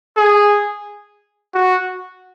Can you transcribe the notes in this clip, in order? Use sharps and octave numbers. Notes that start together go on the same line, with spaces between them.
G#4
F#4